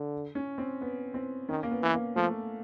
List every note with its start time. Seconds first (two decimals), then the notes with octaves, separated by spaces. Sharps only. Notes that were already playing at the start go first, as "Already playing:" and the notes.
Already playing: D3
0.35 C#4
0.58 C4
0.81 B3
1.14 C4
1.49 D#3 C#4
1.63 A#3
1.71 B3
1.83 E3
1.94 A#3
2.16 F3 A3